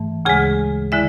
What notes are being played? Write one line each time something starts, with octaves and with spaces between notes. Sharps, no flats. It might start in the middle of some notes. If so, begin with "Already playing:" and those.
Already playing: G#2 E3 A3
D2 C#3 G#3 G#4 G#5
D3 G#3 E4 E5